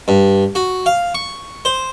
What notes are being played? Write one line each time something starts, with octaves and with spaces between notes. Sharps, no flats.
G2
F#4
F5
C#6
C5